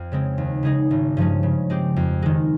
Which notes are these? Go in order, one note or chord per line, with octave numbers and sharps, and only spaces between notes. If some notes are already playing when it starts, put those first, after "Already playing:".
Already playing: F2
C#3 G#3 C4
D#2
C#3 G#3 D#4 G#4
G#1
G2 F3 G#3 C#4
C#3
G#3 C4 G4
F2
D#3 G#3